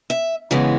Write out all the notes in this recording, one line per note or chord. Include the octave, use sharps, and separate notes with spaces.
E5
C#3 E3 G#3 B3